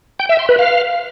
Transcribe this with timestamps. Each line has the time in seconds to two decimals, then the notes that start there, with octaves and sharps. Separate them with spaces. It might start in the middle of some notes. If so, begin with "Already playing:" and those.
0.20 G5
0.29 E5
0.39 C6
0.49 B4
0.59 F5